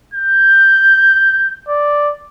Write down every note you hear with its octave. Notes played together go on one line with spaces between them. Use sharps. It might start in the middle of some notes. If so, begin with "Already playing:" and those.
G6
D5